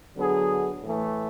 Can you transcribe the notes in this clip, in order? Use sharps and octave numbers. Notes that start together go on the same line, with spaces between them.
D3 F#3 B3 D4 G#4
A2 E3 A3